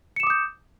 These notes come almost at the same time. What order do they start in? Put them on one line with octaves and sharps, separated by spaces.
C#7 E7 D6 D#6 G6